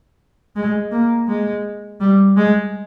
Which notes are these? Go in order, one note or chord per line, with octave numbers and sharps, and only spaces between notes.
G#3
A#3
G#3
G3
G#3